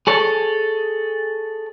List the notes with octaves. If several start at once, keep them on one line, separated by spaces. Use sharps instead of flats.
G#4 A4 C#5